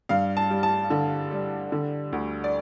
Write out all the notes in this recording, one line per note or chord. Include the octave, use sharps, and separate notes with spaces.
G2 F5
A5
G3
A5
D3
G3
D3
D2
D5